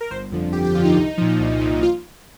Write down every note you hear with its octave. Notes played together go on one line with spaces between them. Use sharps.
A#4
G1 C5
F2 D3 F3
G1 G4
G4
F2 D3 F3 F4
D#4
C2
A#2 F3
C2
A#2 F3
F4